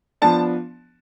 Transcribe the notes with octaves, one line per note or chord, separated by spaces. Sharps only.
F3 B3 D4 A5